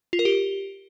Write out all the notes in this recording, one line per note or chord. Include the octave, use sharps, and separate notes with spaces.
F4
A#4
G4